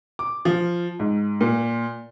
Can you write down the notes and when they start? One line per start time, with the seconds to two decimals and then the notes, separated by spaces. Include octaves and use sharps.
0.19 D6
0.45 F3
1.00 G#2
1.41 A#2